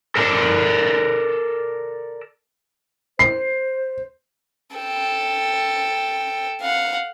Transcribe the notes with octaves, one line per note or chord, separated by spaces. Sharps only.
A4 A#4 D5 A5
C5 C7
A4 G5
F5 F#5